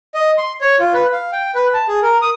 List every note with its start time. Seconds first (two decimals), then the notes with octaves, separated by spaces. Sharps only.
0.14 D#5
0.38 C6
0.61 C#5
0.80 F4
0.94 B4
1.12 F5
1.33 G5
1.55 B4
1.73 A5
1.88 G#4
2.03 A#4
2.22 D#6